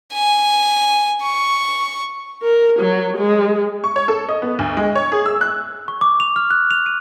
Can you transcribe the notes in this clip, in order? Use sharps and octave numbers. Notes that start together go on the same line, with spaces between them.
G#5
C#6
A#4
F#3
G#3
C#6
C#5
A4
D#5
B3
D2
G#3
C#5
G#4
E6
F#6
C#6
D6
F7
F6
F#6
F7
D#7